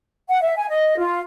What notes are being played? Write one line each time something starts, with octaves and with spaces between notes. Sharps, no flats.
F#5
E5
G#5
D#5
F4